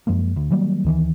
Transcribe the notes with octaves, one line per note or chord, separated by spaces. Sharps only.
F#2 F3 G#3 A#3
D2
D#3 F#3 G3 A#3
D2 D#3 E3